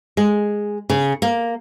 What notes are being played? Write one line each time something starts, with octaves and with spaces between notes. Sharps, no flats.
G#3
C#3
A#3